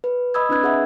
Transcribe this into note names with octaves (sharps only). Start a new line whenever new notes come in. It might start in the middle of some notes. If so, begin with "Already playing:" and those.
B4
D#5 B5 D#6 E6 G#6
C4 D4 E4 B4 F#6 G#6
G#4 E5 F#5 E6